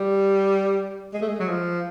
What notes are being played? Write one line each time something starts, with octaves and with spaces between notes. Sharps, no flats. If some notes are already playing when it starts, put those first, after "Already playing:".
Already playing: G3
G#3
A3
G#3
F#3
F3